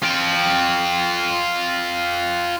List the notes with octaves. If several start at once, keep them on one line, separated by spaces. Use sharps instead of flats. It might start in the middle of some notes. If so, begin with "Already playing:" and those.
F4 G5